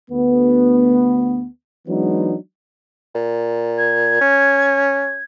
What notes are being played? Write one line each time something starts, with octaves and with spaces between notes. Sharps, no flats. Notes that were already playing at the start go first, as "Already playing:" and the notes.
D2 B3
E3 F#3 G#3 B3 D4 D#4
A#2
G#6
C#4